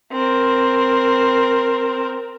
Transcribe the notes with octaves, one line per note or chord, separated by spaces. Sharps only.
C4 A#4